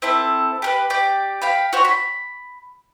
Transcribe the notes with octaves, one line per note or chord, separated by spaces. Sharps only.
C4 E4 A4
G4 A#4 B4
G4 D5 G5
F5 G5 B5
F#4 C5 C#5
B5